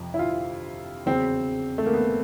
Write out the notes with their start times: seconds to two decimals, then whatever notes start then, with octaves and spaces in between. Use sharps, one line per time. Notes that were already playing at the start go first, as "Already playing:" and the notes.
Already playing: F2 C3 F3
0.14 E4
0.19 F4
1.06 E2 C#3 F#3 C4
1.78 A3
1.86 A#3
1.93 B3